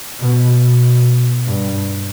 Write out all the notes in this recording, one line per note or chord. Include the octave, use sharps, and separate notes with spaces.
B2
B2
G2